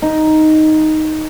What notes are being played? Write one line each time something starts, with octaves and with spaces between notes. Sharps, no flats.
D#4